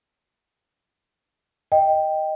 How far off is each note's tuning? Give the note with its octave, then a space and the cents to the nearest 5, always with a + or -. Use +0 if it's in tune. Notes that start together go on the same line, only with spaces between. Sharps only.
D#5 +0 G5 +0